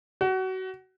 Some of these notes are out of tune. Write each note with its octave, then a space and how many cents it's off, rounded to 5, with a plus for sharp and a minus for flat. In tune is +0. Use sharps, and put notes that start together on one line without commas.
F#4 +25